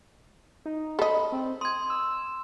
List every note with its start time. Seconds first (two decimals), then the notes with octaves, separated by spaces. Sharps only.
0.66 D#4
0.99 A4 D#5 B5
1.32 C4
1.61 C6 D#6 G#6
1.90 E6